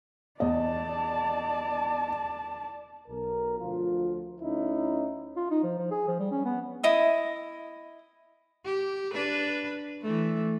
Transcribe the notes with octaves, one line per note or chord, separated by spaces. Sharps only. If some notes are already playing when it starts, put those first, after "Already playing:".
E2 D5 D#5 A5
B1 A#4
D2 F3 F4
D2 C#4 D#4 E4
F4
D#4
F3
F3
G#4
F3
G3
C#4
B3
E4 D#5 D#6
G4
D4 B4
E3 A3